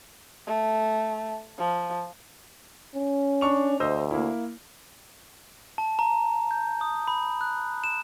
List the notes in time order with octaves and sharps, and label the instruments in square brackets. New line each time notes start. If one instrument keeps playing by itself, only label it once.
[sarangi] A3
F3
[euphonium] C#4
[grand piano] D4 C#6 F7
[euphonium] D2 [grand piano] C5 D#5 E6
[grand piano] A#3 E4
[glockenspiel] A5
A#5
G6
D#6
B5
F#6
E7